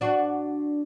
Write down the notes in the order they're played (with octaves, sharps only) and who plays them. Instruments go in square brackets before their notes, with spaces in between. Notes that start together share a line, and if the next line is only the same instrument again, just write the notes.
[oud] D4 F#4